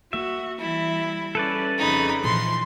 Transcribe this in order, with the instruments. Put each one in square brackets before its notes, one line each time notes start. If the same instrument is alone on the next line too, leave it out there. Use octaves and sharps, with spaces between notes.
[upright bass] A#3 [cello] F#4 [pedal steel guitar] E5
[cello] E3 G3 [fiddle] E4
[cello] G3 C#4 [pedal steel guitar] A4 B4 D5
[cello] F2 C#3 [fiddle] D#4 B5
[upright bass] A#2 [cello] E3 F3 [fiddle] C6